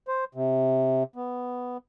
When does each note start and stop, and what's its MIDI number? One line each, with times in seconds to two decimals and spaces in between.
0.08 0.24 72
0.35 1.03 48
1.16 1.77 59